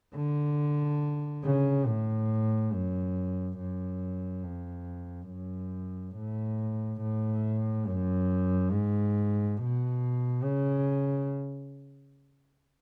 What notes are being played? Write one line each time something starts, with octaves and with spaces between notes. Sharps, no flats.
D3
C#3
A2
F#2
F#2
F2
F#2
A2
A2
F#2
G#2
B2
C#3